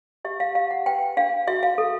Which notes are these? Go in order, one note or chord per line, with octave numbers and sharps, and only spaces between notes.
G4 E5
F5
G4 F5
F#5
B4 G5
D4 F5
F#4 E5
F5
A4